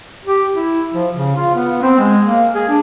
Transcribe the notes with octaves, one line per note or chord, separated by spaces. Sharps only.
G4
E4
F3
C#3
F4
B3
C4
G#3
A#3
G#4
D4